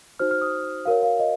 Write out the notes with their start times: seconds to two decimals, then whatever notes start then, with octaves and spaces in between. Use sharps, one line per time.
0.19 D#4 F#4 C5 F6
0.31 F6
0.41 D#6
0.85 F#4 A#4 C#5 F5
1.03 F5
1.19 D#5